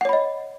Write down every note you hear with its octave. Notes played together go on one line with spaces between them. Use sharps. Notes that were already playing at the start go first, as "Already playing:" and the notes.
C#5 D#5 F#5 B5